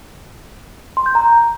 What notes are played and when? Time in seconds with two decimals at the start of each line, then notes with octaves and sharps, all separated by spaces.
0.97 C6
1.06 G6
1.15 A#5